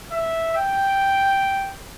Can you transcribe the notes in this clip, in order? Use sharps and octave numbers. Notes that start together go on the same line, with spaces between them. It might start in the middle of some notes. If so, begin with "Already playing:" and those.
E5
G5